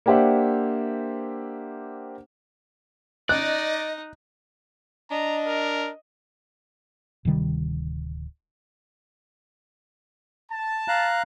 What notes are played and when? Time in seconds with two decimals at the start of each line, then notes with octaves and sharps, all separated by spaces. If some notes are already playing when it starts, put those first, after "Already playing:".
0.06 A#3 D4 G4 C5 E5 F#5
3.29 D#4 D5 D#5 F#6
5.11 D4 D#5 A#5
5.47 A#4
7.25 D1 C3 D#3 G3
10.52 A5
10.88 F5 A#5 F#6